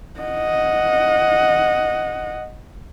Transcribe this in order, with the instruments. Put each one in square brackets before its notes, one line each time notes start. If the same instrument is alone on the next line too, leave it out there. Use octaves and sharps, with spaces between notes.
[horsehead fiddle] D#5 F#5